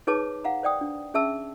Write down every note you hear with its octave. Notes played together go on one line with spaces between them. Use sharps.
D#4 G#4 B4 C#5 A5 D6
F5 F#5 A#5
C5 D5 G5 D#6
D4
C#4 G#4 E5 A5 E6